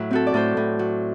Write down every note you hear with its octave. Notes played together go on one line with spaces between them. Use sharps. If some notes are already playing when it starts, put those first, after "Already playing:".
Already playing: A2 F#3 E4
C4 F#4 A4
D5
A2 A4 C5
A2
F#3